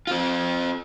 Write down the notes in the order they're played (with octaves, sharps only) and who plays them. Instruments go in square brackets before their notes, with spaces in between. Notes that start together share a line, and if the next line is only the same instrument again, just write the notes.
[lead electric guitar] C4 F4